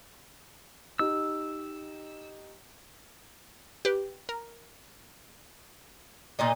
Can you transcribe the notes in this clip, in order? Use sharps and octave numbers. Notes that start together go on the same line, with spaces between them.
D#4 G4 E6
G4 B4
A#4
A#2 D#4 D#5